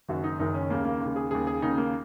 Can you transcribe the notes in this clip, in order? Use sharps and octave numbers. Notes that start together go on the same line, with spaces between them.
F#1 F#2 D#3 F#4
D#4
F#1 F#2 D#3 D#4
C#4
D#2 C#3 A#3
A#3
D#2 C#3
G#4
D#2 C#3 G#4
G#4
D#2 C#3 D#4
A#3